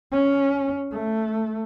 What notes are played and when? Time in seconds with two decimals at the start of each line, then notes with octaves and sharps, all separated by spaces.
0.12 C#4
0.92 A3